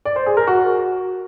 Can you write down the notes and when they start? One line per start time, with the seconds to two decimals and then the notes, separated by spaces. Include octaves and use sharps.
0.05 D5
0.16 C5
0.26 G#4
0.37 A#4
0.47 F#4